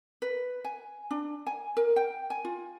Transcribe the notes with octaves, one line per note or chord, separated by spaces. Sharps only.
B4
G#5
D4
G#5
A#4
G5
G#5
F4